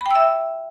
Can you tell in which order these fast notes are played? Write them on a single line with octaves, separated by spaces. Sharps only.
B5 G5 E6 E5